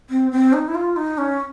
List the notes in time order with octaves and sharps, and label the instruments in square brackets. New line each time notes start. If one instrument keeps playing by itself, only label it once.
[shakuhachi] C4
C4
D#4
E4
F4
D#4
C#4